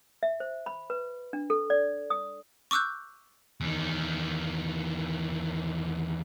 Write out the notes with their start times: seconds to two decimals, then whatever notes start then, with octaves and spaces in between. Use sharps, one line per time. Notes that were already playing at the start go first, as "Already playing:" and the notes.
0.23 E5
0.40 C5
0.66 B5
0.90 B4
1.33 D4
1.50 A4
1.70 D5
2.10 D#6
2.71 C#6 D6 E6 F#6 G6
3.61 E2 D#3